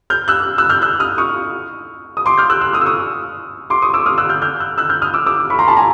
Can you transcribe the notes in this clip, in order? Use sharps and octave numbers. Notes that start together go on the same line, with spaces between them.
F6 G6
E6 F#6
E6 F#6
F6 G6
E6 F#6
D#6 F6
C#6 D#6
D#6
C6 D6
F6 G6
E6 F#6
E6 F#6
D#6 F6
E6
C#6 D#6
C6 D6
C#6 D#6
D6 E6
D#6 F6
E6 F#6
F6 G6
F6 G6
E6 F#6
E6 F#6
F6 G6
D#6 F6
D6 E6
D6 E6
B5 C#6
A#5 C6
A5 B5
G#5 A#5